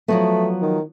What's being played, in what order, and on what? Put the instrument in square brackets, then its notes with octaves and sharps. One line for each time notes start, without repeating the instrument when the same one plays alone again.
[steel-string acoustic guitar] F3 F#3 B3 [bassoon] A3
[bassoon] D#3